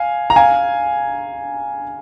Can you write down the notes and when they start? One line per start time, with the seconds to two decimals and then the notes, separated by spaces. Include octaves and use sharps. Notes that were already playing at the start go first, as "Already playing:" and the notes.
Already playing: F5 G#5
0.30 A#5
0.36 F5 G#5